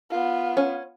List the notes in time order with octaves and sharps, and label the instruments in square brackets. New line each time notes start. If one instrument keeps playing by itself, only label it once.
[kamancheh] B3 F4
[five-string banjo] C#4